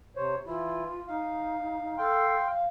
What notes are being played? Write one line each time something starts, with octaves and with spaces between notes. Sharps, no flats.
C3 C5 C#5
E3 E4 F4
D#4 F5
A4 F5 G5 C6
F5